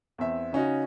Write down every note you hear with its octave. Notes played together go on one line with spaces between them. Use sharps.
E2 C4 E5
C#3 C#4 D#4 F#4